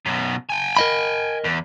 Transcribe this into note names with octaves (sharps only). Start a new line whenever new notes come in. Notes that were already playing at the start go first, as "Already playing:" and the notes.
F#2 B2
G5 G#5
A#4 D#5 B5
E2